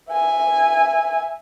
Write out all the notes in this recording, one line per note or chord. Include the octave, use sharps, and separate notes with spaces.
E5 G#5